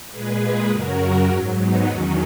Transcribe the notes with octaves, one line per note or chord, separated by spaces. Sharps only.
A#2 G#3 G#4 B4
G#4 B4
F#2 C#3 F#3 F#4 A#4
G#2 F#3
B3 D#4
E2 D#3 F#3 C#4